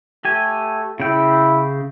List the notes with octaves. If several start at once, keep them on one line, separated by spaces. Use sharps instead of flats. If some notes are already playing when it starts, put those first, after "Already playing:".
A3 G4 G#5
C#3 E4 G5